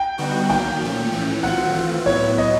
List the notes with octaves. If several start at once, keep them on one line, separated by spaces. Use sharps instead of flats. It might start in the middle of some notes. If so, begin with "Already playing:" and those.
Already playing: G5
D3 G3 B3 D#4 F#4
D#3 F#3 A#3 G5
A#2 F3 A3 C#4
A2 E3 A3 C#4
D#3 F#3 A3 C4 F4 F#5
E3 A3 C4 F4
A2 F#3 B3 E4 C#5
D#5